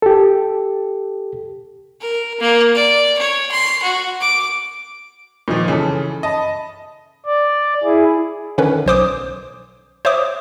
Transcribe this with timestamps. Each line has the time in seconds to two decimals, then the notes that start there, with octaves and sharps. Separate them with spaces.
0.02 G4 A4
2.01 A#4
2.40 A#3
2.75 D5
3.18 C#5
3.51 C6
3.83 F#4
4.21 D6
5.48 A#2 D#3 F3
5.68 C#3 E3 A4
6.23 D#5 A5 B5
7.26 D5
7.84 E4 G#4
8.58 D3 D#3 C#4 B4
8.86 B1 C5 D6 D#6
10.05 C5 C#5 E5 D6 D#6